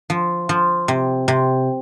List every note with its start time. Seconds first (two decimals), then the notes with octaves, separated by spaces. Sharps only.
0.10 F3
0.49 F3
0.88 C3
1.28 C3